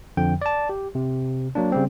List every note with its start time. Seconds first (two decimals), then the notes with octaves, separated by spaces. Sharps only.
0.17 F2 D3 F3 G5
0.42 D5 A5
0.69 G4
0.95 C3
1.55 F#3 A#3 D4
1.72 C#3 G3 C4